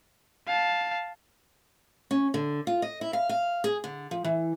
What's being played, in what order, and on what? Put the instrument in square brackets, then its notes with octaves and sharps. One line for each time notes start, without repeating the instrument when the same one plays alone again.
[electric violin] F5 A5
[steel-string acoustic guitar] C#4
D3
F4
D#5
E4
F5
F5
G#4
D3
F3
E3